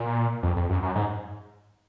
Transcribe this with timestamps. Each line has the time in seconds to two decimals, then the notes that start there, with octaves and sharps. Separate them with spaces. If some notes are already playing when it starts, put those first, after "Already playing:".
Already playing: A#2
0.43 F2
0.56 F2
0.69 F#2
0.82 F#2
0.95 G#2